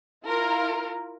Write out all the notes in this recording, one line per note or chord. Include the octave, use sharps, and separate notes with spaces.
E4 F4 A#4